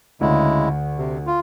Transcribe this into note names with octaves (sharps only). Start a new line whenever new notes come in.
D2 C#3 G#3 E4
C3
F4